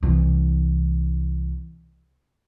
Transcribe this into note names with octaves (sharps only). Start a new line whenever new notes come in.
C2 E3